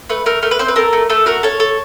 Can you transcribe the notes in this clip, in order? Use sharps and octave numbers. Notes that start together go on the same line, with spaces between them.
A3 B4
A3 A#4
A3 A#4
B4
C4 C5
B4
A4 A#4
A3
A3 A4
F#4 A#4
A4 C#5
A4